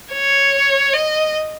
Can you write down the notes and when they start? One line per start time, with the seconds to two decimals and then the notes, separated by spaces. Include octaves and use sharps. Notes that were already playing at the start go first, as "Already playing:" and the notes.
0.12 C#5
0.93 D#5